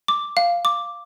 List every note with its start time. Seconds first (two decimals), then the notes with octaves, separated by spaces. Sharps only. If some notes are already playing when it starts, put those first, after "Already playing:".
0.08 D6
0.37 F5
0.65 D6